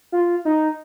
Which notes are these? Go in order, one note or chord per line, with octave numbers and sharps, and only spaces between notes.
F4
D#4